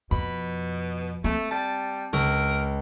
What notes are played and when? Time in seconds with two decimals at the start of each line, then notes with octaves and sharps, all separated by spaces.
0.11 F2 B2 B5
1.24 A3 C4
1.51 G3 A5
2.13 C#2 A#4